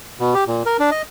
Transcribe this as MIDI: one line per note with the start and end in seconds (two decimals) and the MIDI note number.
0.20 0.34 47
0.34 0.44 67
0.47 0.63 46
0.66 0.77 70
0.80 0.90 62
0.91 1.02 75